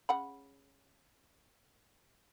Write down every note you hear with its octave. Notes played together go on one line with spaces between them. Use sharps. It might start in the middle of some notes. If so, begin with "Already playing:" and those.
C#3 F#5 B5